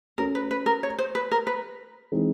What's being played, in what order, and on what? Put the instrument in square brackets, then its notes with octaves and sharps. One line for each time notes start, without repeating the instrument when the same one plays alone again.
[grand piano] A3 C#4 F#4 [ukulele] A#4
[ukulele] B4
B4
A#4
C#5
C5
B4
A#4
B4
[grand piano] E3 G#3 C4 D#4